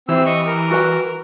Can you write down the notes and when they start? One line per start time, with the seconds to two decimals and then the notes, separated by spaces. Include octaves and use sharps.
0.09 E3 C4 E4 G4 E6
0.26 D#5 C#6
0.47 A#4
0.71 F#4 B4 G5